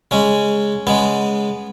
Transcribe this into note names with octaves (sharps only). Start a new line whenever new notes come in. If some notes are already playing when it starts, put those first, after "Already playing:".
C#3 G#3 C#4
C#3 G#3 B3